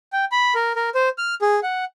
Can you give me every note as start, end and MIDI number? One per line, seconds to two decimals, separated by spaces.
0.13 0.25 79
0.32 0.54 83
0.55 0.73 70
0.76 0.90 70
0.95 1.09 72
1.18 1.35 89
1.42 1.60 68
1.63 1.85 78